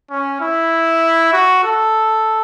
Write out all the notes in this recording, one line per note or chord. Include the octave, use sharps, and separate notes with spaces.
C#4
E4
F#4
A4